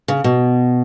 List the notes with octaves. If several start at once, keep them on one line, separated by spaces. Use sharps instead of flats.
C#3
B2